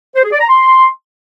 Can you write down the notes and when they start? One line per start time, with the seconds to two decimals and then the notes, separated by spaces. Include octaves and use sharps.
0.16 C5
0.24 G#4
0.32 D5
0.41 A#5
0.49 C6